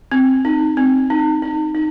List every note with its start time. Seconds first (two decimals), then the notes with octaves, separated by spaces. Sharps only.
0.12 C4
0.45 D#4
0.77 C4
1.10 D#4
1.42 D#4
1.75 D#4